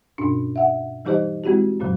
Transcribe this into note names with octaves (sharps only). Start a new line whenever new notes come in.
G2 B2 C#4 D4
E5 F#5
E3 G3 D#4 G4 C5 D#5
G#3 C4 E4 F#4 G4
F#2 A#2 C#3 F#3